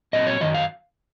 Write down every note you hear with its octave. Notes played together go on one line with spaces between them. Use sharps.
A#2 F#3 C4 D#5
C#5
F#2 D#3 F#3 D#5
F5